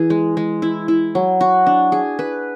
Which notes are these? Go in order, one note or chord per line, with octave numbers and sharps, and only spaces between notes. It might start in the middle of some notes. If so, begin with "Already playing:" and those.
Already playing: E3 G#4
G#3
G#3
E4
E4
F#3
F#4
D4
G#4
B4